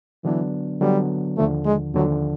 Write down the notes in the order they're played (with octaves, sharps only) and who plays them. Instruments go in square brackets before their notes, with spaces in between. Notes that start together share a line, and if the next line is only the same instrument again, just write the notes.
[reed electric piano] D3 F#3 B3 D4 [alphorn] E3
[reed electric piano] D3 F#3 B3 D4 [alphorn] G3
[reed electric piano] D#2 D3 F3 [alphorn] A3
[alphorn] G#3
[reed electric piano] D#2 D3 F3 [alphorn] F#3